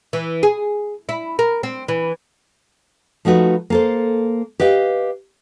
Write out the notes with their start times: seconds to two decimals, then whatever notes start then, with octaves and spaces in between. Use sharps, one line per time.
0.13 E3
0.43 G#4
1.09 E4
1.39 A#4
1.63 C4
1.88 E3
3.25 F3 A3 D#4 F#4 B4
3.70 A#3 A4 C5
4.60 G4 B4 D#5 F5